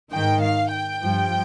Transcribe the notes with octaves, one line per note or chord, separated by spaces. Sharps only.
G#2 D#3 G5
F5
G5
G2 F3